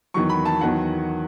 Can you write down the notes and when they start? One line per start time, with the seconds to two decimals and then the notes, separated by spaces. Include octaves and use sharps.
0.14 E2 D#3 F#3 C#6
0.29 B5
0.45 A5
0.61 E2 D#3 F#3 F#5